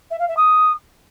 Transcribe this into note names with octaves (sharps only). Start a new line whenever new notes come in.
E5
F5
E5
D#6